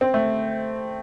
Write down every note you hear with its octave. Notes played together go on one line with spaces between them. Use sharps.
C4
A3